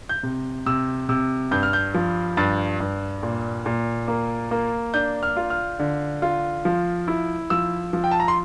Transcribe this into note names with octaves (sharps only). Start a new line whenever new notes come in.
G6
C3
C3 E6
C3 E6
G2 G6
F6
G6
F3
G2 A6
G2
A#2
A#2
A#3
A#3
D4 G6
F6
F4
F6
D3
F4
F3
E4
F3 E6
F3
G5
A5
A#5
C6